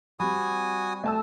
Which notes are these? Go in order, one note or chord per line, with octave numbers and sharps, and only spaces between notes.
G3 C4 F#4 G#5 B5 D#6
A3 A5 E6